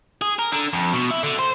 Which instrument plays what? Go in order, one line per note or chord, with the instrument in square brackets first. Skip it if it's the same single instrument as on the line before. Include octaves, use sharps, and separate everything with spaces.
[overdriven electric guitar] G#4
A#4
D3
F2
B2
E4
D3
C5